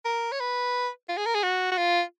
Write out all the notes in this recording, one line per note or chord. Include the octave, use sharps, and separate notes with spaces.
A#4
C#5
B4
F4
G#4
A#4
G#4
F#4
F#4
F4